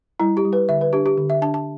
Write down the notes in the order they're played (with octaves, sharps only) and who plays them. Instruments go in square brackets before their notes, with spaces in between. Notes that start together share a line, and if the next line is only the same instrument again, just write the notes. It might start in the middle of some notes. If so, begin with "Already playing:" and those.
[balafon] G3 E4
G4
G3
B4
D3 E5
B4
D4 G4
G4
D3
E5
D4 A5
A5